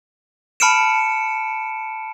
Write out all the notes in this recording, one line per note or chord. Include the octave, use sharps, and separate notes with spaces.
A5 B5 F6 C#7 D7 E7